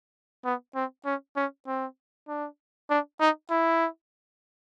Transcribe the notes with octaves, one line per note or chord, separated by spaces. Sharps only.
B3
C4
C#4
C#4
C4
D4
D4
D#4
E4